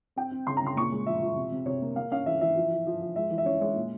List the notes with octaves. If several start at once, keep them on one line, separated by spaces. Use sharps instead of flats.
C4 G5
C4
C#3 C6
A#5
C#3 C6
A#2 C#6
G#3
F3 E5
F3
C3
C3
C3 C#5
A#3
A#3 F5
C#4 F5
E3 E5
E3 E5
F3
F3
F3
F3
G#3 E5
E3
E5
C#4 C#5
G#3 C#5
A#2